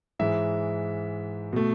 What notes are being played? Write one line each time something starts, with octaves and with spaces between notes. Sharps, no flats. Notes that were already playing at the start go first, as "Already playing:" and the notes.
G#2 E3 G#3 E5
B2 A3